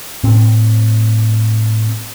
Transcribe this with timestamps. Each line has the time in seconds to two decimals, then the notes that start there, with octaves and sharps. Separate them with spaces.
0.24 A2 C4